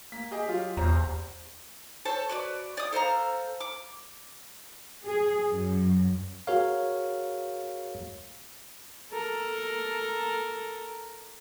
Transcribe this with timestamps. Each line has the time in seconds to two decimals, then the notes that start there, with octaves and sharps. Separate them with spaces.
0.12 A#3 B6
0.31 G4 G#4 D#5
0.48 F#3 F4 G4
0.77 D#1 E2 C5 A#5
2.05 A4 C5 C#5 A5
2.29 F#4 B4 D5
2.77 D5 D#6
2.92 A4 C5 F5 A#5
3.60 D6
5.05 G#4
5.49 F#2
6.47 F#4 G#4 A#4 C#5 F5
9.12 A4 A#4